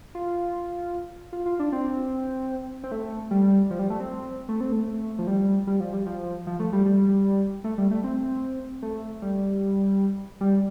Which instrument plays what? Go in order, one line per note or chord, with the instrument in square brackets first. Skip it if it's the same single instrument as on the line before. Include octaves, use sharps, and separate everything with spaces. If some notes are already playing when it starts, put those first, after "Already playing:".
[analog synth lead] F4
F4
F4
D4
C4
C4
A3
G3
F3
G3
A3
C4
A3
C4
A3
F3
G3
G3
F3
G3
F3
F3
A3
G3
G3
A3
G3
A3
C4
A3
G3
G3